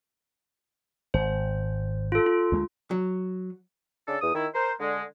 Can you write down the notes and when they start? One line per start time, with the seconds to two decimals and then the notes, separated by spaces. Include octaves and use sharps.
1.14 G#1 C5
2.12 F4 A4
2.26 F4
2.52 D2 G#3
2.91 F#3
4.06 C#3 D4 A4
4.21 E2 D#6
4.34 D#3 E4
4.54 A#4 C5
4.79 D3 G#3